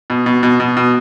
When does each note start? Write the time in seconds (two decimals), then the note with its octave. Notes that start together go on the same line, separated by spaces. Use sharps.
0.10 B2
0.26 B2
0.43 B2
0.60 B2
0.77 B2